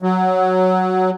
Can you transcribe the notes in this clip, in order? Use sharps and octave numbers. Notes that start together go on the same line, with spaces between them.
F#3